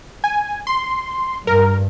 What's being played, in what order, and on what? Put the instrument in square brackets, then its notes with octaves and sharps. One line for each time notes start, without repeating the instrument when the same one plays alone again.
[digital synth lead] G#5
C6
[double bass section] G2 [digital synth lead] A#4